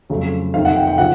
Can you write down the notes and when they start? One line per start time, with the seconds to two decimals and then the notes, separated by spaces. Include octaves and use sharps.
0.09 F2 C#3 F#3 A3
0.54 F2 C3 D#3 F5
0.65 F#5
0.76 G5
0.87 G5
0.98 C#3 F3 F#5